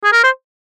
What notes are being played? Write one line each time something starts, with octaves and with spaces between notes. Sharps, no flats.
G#4
A#4
C5